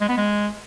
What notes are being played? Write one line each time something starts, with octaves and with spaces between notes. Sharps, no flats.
G#3
B3
G#3